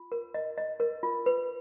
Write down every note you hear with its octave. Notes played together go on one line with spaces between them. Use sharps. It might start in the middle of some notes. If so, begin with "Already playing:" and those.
Already playing: F4
A#4
D#5
D#5
A#4
F4
B4